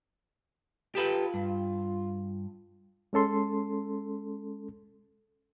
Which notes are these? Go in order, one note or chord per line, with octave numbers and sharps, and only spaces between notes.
F4 G4 A4 B4
G2
G#3 C#4 A4 C6